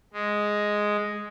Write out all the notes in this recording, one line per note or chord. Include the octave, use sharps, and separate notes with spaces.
G#3